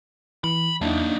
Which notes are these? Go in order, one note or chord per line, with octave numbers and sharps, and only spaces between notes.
E3 B5
E2 F#3 A#3 D4 D#4 E5 A5